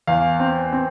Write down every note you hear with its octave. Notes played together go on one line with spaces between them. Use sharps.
E2 F5
C4
C4